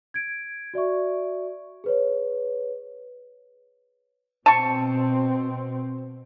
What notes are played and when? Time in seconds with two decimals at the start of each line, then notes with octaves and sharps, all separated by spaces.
0.14 G#6 D7
0.74 F#4 D5 E5 C#6
1.84 G#4 B4 C#5
4.46 B2 C4 A5 C#6